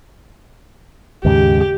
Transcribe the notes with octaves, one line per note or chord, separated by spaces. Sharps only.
D#2 G#2 C#3 G4